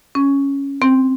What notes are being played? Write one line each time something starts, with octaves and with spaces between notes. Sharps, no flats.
C#4
C4